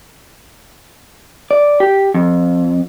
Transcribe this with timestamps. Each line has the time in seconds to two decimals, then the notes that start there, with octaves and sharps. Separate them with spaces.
1.51 D5
1.80 G4
2.14 F2